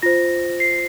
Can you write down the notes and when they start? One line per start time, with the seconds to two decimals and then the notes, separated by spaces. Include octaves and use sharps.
0.02 F4 C5 A#6
0.60 C7